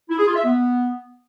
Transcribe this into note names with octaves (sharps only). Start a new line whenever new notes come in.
E4
G#4
F4
E5
B3